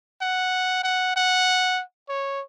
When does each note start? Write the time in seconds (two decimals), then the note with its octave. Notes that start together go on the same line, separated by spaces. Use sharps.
0.21 F#5
0.83 F#5
1.16 F#5
2.09 C#5